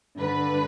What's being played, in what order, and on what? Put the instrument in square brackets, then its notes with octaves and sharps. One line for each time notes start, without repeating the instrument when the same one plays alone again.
[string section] G2 D3 B4